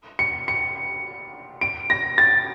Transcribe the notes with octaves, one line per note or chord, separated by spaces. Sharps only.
C#7
C#7
D7
A#6
A6